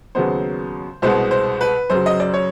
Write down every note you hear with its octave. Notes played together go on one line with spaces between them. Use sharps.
D#2 C#3 F#3 B3 C5
C2 B2 G#3 B3 C5
C5
B4
F#2 C#3 F#3 C5
D#5
D5
C#5